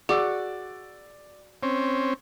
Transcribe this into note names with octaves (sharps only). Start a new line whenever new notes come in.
F#4 G#4 D5 D6 E6
C4 C#4